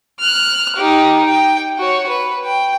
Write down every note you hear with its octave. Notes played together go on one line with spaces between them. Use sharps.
F6 F#6
D#4 G4
G5
F#4 C#5
B4
G5